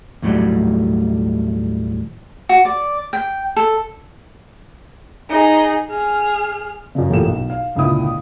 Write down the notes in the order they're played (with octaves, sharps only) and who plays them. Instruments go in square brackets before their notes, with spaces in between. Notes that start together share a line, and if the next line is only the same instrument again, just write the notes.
[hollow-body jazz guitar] D#2 A2 F#3 G3
[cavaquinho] F#4
D5
G5
A4
[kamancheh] D#4 G#4
G#4 F6
[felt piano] F#2 C#3
E1 A1 A#2 G4 A4 E7
B1
F5
G#1 C#2 A#2 D3 E4 D#6